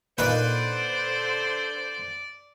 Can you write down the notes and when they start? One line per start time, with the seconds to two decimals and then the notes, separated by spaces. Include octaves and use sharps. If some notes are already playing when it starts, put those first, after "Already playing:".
0.18 A#2 D3 D#4 B4 C5 D5